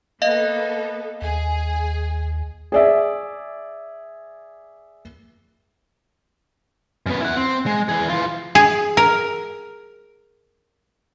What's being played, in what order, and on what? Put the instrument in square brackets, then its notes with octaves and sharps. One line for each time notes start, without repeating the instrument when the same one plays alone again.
[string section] A#3 B3 A4 [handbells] D#5 F5
[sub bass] D#2 [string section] G#4
[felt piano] G#4 D5 E5
[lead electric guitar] F#2 B3
E4 F#5
C4
G#3
E3 G#4
E3 F4
[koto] G#4
A#4